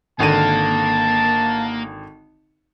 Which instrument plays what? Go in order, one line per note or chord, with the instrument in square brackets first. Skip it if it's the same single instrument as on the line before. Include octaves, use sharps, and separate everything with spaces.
[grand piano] G#1 D3 D#7 [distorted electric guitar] A#3 [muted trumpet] A5